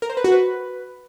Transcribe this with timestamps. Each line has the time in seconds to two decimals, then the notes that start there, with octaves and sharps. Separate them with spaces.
0.02 A#4
0.10 C5
0.17 B4
0.24 F#4
0.32 B4